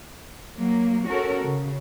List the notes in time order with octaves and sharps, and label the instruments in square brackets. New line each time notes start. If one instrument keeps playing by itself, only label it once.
[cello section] F#3 A#3
C#4 F#4 A4 A#4
C#3